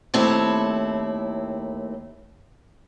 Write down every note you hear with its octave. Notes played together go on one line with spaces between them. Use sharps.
D#2 A3 C4 E4 C#5